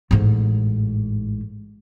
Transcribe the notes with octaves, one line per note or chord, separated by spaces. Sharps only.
A1 G#2